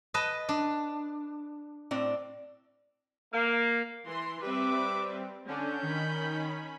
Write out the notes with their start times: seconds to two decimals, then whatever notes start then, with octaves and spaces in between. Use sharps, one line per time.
0.14 B4 D#5 A5
0.49 D4
1.91 A2 C4 D5
3.33 A#3
4.07 E3 C6
4.42 G3 C4 B4 E5 D6
5.47 D3 C#4 D4 G6
5.83 D#3 C#4 B5